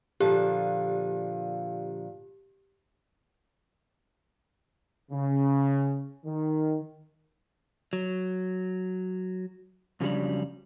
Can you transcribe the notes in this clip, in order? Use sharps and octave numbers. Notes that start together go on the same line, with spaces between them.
A#2 D3 F3 G4
C#3
D#3
F#3
F2 C#3 F#3 G3 D4 D5